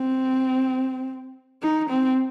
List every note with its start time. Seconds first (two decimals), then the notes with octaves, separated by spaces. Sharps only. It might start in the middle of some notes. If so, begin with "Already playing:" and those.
Already playing: C4
1.62 D#4
1.90 C4